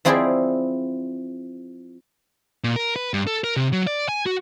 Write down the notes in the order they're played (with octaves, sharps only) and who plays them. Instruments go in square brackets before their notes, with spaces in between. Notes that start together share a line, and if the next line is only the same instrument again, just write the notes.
[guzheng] F3 C4 E4 G#4 C5 D5
[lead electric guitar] A#2
A#4
B4
G2
A4
A#4
C3
F#3
D5
G#5
F#4